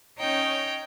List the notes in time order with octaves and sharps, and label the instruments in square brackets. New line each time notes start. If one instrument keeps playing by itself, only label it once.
[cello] C#4 D#4 [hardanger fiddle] C#5 G5